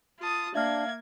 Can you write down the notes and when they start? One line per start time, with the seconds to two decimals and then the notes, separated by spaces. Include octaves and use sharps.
0.19 F4 A5 D#6
0.55 A#3 D4 E5 F5 F6 G#6